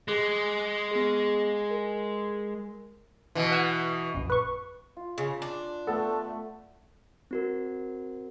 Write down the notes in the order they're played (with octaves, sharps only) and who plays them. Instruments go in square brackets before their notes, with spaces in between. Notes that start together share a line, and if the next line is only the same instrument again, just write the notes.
[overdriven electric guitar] G#3 [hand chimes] G#4 D6 F#6
[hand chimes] B3 G#4
A#4
[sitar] B2 E3
[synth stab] F#5 E6 G#6
A#1 F#2
B4 C#6
[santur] F4
[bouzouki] C#3
D4
[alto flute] A3 [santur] B3 [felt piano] A4
[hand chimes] C4 F#4 A#4